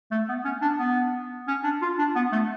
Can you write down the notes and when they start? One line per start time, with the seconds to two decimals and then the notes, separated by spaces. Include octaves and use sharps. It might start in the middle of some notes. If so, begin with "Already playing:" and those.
0.11 A3
0.29 B3
0.45 C#4
0.62 D4
0.79 B3
1.48 C#4
1.64 D4
1.82 F4
1.99 D4
2.16 B3
2.32 A3